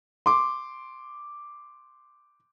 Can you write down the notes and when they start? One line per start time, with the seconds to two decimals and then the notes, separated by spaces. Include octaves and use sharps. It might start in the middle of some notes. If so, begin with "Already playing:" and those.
0.26 C6 D6